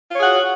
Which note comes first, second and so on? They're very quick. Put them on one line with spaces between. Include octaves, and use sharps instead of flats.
F4 C#5 G#4 F#5 F#4